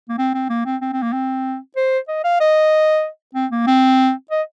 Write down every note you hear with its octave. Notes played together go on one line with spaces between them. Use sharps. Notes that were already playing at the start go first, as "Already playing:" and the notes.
A#3
C4
C4
A#3
C4
C4
C4
A#3
C4
C5
D#5
F5
D#5
C4
A#3
C4
D#5